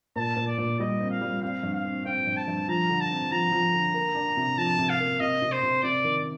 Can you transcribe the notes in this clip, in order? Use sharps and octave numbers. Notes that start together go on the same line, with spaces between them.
A#2 A5
A#2
D5
A#2
G3 D#5
C4
F5
G3
C4 F5
G2
F5
C4
C4 G5
G2
A5
G2
F3 A#5
D3
A5
C4
F3 A#5
F3
D3
A#3
D4
C3
F3 A5
C3
F5
A#3
C3 D#5
C3
C5
C3
C3 D5
D#3